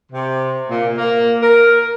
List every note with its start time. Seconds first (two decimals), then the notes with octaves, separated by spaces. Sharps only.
0.12 C3
0.70 A#2
0.97 A#3
1.42 A#4